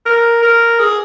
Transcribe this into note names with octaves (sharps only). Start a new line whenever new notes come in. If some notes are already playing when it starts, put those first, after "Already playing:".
A#4
A#4
G#4